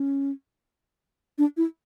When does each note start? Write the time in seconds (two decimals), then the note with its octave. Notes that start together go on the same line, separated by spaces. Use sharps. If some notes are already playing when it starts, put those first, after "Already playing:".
Already playing: C#4
1.38 D4
1.57 E4